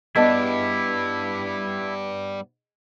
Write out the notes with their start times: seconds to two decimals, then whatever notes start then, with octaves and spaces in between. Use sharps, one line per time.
0.16 G2 G3 B3 D4 E4 G#4 D#5 A5